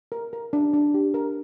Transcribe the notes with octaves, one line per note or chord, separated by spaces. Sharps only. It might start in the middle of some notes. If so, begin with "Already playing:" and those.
A#4
A#4
D4
D4
G4
A#4